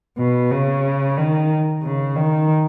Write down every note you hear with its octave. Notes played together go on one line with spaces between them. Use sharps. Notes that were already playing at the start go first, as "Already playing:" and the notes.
B2
C#3
D#3
C#3
D#3